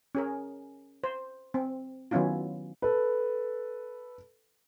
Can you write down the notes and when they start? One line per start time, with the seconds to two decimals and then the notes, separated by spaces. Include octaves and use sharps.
0.15 C#4 G#4 A#4
1.04 C5
1.54 C4
2.11 D#3 F#3 B3 C#4 E4 F4
2.82 A4 B4